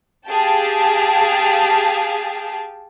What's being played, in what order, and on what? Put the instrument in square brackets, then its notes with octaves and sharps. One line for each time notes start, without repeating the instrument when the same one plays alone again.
[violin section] G4 G#4 F5 G5 A5